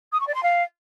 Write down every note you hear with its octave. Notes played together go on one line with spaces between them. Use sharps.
D#6
C#6
D5
C6
F5